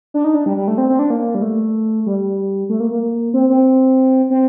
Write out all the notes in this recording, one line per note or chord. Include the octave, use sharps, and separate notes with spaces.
D4
D#4
D4
G3
G3
A3
C4
C4
D4
A#3
G3
A3
G3
A3
A#3
A#3
C4
C4
C4